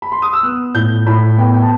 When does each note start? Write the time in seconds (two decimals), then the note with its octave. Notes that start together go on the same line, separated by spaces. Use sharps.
0.02 B5
0.12 C6
0.22 D#6
0.33 E6
0.43 B3 F#6
0.74 A2 G6
1.06 A2 B5
1.38 B3 G5
1.54 G5
1.62 A5